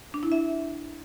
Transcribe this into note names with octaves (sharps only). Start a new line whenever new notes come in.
D4
E4
E5